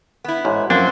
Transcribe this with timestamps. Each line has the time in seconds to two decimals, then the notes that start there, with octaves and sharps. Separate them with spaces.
0.24 B3 E4
0.45 A1 G#2
0.70 F#2 F3 A#3 C4 D4